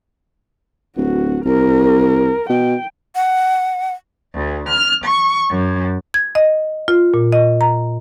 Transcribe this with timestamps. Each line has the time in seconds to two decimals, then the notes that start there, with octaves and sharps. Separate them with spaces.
0.97 D1 F#4
1.45 C2 A#4
2.49 B2 G5
3.15 F#5
4.35 D2
4.69 F6
5.05 C#6
5.51 F#2
6.14 G#6
6.35 D#5
6.88 F4
7.14 A#2
7.33 D#5
7.61 A#5